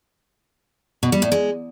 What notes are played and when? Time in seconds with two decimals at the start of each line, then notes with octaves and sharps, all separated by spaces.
1.03 B2
1.12 G3
1.22 A2
1.32 G#3